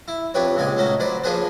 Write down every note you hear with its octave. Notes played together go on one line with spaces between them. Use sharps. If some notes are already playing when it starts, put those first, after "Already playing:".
E4
F2 D4 G4 B4 C#5
C#2 A#2 G#3 D5 G#5
A3 C#4 D#4 F#4
F#3 B4 C5 D5
F3 A#3 D4 G#4 B4 C5